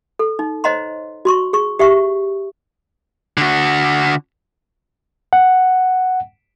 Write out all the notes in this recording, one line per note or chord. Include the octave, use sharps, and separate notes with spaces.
A4
D#4
C5 C#5 D#5 F#5 A#5 C6
F#4 C6 C#6
G#4 C#6
G4 E5 F#5 C#6
D3 F#4
F#5